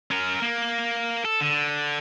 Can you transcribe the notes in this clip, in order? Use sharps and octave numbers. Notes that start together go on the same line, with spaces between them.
C#4 A#4
A#3
A4
D3